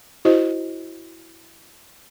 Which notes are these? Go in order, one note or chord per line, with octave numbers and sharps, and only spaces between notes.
E4 F#4 C5 D#5